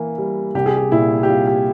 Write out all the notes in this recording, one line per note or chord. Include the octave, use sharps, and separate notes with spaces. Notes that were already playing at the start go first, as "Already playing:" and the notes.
Already playing: E3 A#3
G3
C2 G4
G#4
G4
A#2 E4
G4
C2 F4
G4